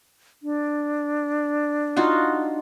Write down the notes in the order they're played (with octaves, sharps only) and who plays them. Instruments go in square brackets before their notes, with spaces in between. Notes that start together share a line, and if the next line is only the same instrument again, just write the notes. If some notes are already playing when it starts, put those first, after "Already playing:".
[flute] D4
[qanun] D#4 F4 F#4